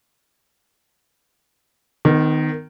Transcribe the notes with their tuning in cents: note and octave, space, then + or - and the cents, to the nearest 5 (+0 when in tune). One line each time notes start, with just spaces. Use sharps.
D#3 -10 B3 +35